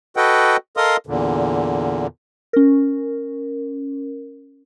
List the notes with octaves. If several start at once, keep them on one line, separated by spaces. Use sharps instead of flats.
F#4 A4 B4 D#5 F#5 G5
A4 A#4 D#5 F5 C6 D#6
E2 A#2 D3
C#4 A#4